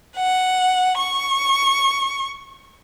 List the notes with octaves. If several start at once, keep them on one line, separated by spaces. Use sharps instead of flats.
F#5
C#6